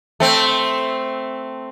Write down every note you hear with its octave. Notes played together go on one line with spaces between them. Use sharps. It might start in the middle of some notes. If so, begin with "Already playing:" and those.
A3 C4